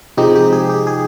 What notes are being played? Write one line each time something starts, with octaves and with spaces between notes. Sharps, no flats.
C3 F3 G#3 D#4 G4
G4
G#4
G4
G#4